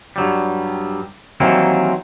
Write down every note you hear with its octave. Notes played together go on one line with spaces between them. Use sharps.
G2 F#3 G3
D#3 E3 F#3 G3 A#3 C4